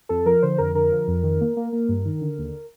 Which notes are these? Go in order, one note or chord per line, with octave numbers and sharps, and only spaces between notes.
F2 A4
F3 A#4
D3 C5
F2 A#4
D3 A#4
F3
F2
D#3
A#3
A#3
A#3
G2
D#3
D3
D#2